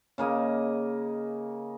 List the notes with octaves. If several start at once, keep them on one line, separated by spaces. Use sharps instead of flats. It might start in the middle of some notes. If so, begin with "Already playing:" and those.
C#3 A#3 D#5